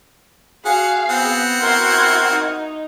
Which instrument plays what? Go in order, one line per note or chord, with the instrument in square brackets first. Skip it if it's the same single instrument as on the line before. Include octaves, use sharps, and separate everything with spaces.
[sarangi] F#4 [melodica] G#4 [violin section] F5 [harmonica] F#5
[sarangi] B3 [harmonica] C4 F#5
[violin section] E4 F#4 G#6 [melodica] A#4 [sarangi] C6
[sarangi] D#4